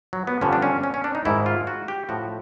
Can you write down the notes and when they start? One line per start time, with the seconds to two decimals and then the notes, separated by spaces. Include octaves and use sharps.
0.13 F#3
0.27 B3
0.41 G2 D3 F3 C#4
0.53 D4
0.62 C#4
0.83 C#4
0.94 C#4
1.04 D4
1.15 D#4
1.25 G#2 D#3 E4
1.46 F4
1.67 F#4
1.88 G4
2.09 A2 F3 F#4